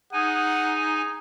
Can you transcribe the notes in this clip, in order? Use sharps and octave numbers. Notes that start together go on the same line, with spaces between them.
D#4 G#4 F#5 G#5